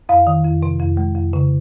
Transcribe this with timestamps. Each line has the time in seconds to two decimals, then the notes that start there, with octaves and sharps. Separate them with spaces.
0.09 F2 F5
0.27 D#3
0.44 F2
0.63 C3
0.80 F2
0.97 G#3
1.15 F2
1.33 C#3